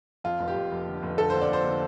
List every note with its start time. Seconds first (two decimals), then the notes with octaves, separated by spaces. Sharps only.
0.24 F2 F4
0.40 F1
0.48 G4
0.55 F1
0.72 F1
0.87 D3
1.03 F1
1.18 D3 A4
1.30 C5
1.33 D3
1.42 D5
1.49 F2 C5
1.64 D3